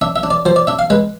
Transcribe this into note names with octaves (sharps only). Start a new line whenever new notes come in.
D4 E5
E5
D4
D5
F3 C5
D5
D4 E5
F5
G#3 B4